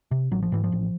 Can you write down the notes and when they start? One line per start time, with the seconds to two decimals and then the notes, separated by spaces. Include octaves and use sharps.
0.11 C3
0.31 A1 F#3
0.42 F3
0.52 G#2 E3
0.64 F3
0.72 A1